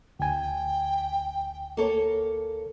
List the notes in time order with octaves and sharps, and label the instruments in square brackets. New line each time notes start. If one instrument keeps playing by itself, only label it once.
[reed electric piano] D2 G#5 [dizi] G5
[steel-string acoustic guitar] A#3 A4 C#5